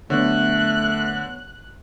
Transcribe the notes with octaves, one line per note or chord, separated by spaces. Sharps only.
D3 F#3 A3 B3 C#5 F#6